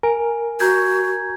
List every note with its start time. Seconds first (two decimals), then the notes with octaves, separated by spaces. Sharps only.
0.03 A#4 G#5
0.60 F#4 A#5 G6 G#6